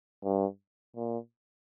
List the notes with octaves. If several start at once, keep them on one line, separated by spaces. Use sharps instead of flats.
G2
A#2